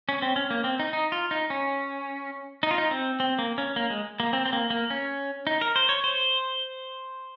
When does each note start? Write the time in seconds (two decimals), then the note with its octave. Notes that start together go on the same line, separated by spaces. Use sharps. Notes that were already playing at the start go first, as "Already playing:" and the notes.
0.09 C#4
0.22 C4
0.36 C#4
0.51 A#3
0.64 C4
0.79 D#4
0.93 D#4
1.12 F4
1.31 D#4
1.50 C#4
2.63 D#4
2.71 F4
2.78 D#4
2.91 C4
3.20 C4
3.39 A#3
3.58 C#4
3.76 A#3
3.90 G#3
4.20 A#3
4.33 C4
4.45 C4
4.53 A#3
4.70 A#3
4.90 C#4
5.47 D#4
5.61 A#4
5.76 C5
5.89 C#5
6.04 C5